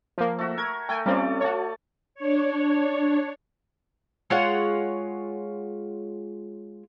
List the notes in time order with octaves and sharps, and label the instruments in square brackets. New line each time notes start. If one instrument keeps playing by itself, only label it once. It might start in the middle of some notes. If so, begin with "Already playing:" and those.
[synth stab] F3 A#3
[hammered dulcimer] A3 F#4 E5
[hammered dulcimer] A#4 [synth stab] G#6
[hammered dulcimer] A3 [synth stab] G5 G#5
[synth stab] G3 C4 C#4 [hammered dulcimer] A3 F4 D5
[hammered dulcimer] A3 A5 [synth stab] F#4 C#5
[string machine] D4 C#5
[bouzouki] G#3 F4 C#5 F#5